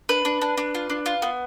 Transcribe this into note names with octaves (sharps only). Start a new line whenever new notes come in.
D4 B4
D4
D4
D4
F4
D4
F4
B3